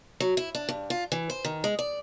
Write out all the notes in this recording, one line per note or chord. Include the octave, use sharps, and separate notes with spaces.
F#3
E4
D4
G2
F4
E3
C5
D#3
G#3
D5